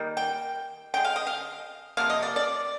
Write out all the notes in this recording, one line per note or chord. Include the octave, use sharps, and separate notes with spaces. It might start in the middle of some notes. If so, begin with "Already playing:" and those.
Already playing: D#3 G3 A#3
G5
D3 G#3 G5
F5
D#5
F5
C3 F3 A#3 F5
D#5
D5
D5